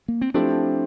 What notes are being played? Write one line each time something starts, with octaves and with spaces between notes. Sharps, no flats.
A#3
C4
F3 A3 C4 D4 E4 G4